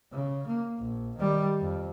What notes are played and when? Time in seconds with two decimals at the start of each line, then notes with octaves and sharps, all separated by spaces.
0.12 C#3
0.47 A#3
0.79 A#1
1.16 D#3 G3
1.61 F2